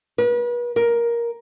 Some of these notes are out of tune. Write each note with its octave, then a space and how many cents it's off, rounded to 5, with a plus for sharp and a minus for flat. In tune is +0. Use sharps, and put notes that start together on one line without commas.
B4 -40
A#4 +10